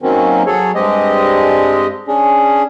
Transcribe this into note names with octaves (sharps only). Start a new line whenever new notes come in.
D#3 F#3 A#3 C4 C#4
F#3 G#4 A4 C#5
G2 G#3 C4 G4 D#5
C#4 D4 G#4